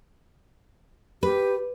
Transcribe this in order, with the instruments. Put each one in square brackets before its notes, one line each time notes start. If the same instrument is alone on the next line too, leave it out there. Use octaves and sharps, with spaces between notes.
[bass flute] G4 [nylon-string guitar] B4